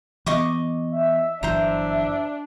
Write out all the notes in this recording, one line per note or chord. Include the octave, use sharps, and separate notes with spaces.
E3 B3 D#5 C#6 D6
E5
G1 F#2 E3 D4 C5 A#5